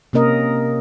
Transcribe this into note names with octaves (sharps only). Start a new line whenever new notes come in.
C3 A#3 C#4 A#4 D#5